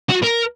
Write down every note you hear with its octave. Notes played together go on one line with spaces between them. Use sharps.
F#4
A#4